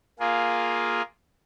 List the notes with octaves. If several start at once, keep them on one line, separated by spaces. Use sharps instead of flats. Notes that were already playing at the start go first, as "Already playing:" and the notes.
A#3 F4 G#4